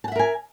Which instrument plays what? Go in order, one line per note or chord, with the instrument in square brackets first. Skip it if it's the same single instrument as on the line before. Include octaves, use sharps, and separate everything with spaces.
[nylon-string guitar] A5
F#5
E5
A#4
G#5